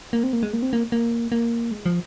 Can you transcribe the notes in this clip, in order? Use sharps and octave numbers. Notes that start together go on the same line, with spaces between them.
A#3
C4
A#3
G#3
A#3
C4
A#3
A#3
A#3
G#3
F3